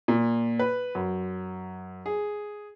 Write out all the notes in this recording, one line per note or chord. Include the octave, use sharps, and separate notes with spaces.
A#2
B4
F#2
G#4